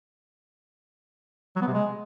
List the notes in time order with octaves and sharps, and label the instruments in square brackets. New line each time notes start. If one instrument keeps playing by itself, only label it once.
[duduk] F#3
B3
C3
G#3